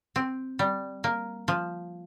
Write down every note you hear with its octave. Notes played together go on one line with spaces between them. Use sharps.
C4
G3
A#3
F3